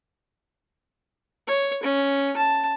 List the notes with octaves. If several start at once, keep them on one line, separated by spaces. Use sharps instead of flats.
C#5
C#4
A5